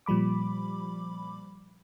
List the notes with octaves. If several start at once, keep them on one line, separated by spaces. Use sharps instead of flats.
A#2 F3 G3 B5 D6